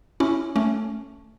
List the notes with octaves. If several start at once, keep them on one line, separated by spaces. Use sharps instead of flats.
C#4 E4
A3 C#4